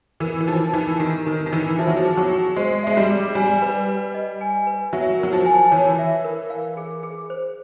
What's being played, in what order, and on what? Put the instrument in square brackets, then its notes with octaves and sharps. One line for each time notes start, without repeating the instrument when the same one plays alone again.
[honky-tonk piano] E3 [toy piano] A#4
[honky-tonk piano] E3
[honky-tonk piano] F3 [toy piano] D#4
[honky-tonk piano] E3 [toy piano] D#4
[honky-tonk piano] D#3 [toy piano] G4
[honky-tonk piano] D#3 [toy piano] A#4
[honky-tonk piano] D#3
[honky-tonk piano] E3 [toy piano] D#4
[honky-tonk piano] F3 [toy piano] E5
[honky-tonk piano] F#3
F3
[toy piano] G#4
[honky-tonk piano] F#3
[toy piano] G5
[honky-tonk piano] G#3 [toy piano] C5
[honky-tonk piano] G#3 [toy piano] E5
[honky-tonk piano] G3
[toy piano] G#4
[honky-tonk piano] G3 [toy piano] G#5
[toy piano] B4
B4
D#5
G#5
B4
[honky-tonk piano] F#3 [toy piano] E5
[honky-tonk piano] F#3 [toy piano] A#4
[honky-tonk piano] F3
[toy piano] G#5
[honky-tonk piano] E3 [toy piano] C#5
[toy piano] E5
A#4
F5
G#4
G#4
C5